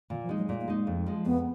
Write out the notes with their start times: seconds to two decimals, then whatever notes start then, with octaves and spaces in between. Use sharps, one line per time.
0.10 A#2 D#3
0.23 F3
0.29 G#3 D#4
0.36 F#3
0.49 A#2 G#3
0.61 A#3
0.68 G#3 D#4
0.87 F2
1.06 F3 G#3
1.25 F2 B3